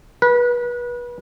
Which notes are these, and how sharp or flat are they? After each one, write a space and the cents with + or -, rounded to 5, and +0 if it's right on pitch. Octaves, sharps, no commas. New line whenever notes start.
B4 -30